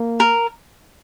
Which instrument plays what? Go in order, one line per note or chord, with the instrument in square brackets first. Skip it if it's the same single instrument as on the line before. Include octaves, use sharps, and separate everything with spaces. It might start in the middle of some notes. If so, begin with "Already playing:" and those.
Already playing: [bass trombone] A#3
[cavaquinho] A#4